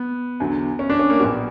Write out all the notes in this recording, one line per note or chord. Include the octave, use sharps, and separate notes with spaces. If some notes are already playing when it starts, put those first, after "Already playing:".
Already playing: B3
E2 D3 F#3
C#4
D4
C#4
A#3
A#1 A#2 F#3 B3 F#4